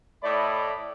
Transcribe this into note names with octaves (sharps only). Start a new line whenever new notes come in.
A2 A3 E4 D5 D#5 B5